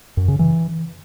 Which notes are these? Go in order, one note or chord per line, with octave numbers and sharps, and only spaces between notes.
F#2
C#3
E3